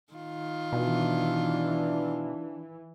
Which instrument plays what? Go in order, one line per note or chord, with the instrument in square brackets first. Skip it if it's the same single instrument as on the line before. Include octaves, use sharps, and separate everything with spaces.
[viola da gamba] D#3 F4
[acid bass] B2 [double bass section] E3 [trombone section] D4